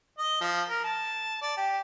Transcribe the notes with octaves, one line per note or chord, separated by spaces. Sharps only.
D#5
F3
A#4
A5
D5
G4